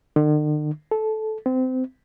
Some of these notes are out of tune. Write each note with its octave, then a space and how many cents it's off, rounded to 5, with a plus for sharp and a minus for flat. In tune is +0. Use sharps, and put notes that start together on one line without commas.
D3 +45
A4 -15
C4 -25